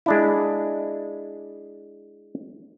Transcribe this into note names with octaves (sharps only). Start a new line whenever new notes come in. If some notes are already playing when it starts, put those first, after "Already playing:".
G#3 D4 E4